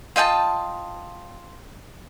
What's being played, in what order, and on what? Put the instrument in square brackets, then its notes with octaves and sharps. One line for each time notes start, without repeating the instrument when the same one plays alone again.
[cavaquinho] F4 D#5 G5 A5